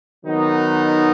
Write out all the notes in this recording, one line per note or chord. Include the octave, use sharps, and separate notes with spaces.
D#3 F#3 B3 D#4